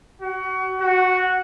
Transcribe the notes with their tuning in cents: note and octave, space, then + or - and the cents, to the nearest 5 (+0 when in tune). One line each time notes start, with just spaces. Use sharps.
F#4 +25
F#4 -5